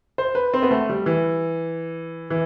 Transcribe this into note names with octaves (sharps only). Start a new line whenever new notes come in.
C5
B4
C4
B3
A3
G3
E3
E3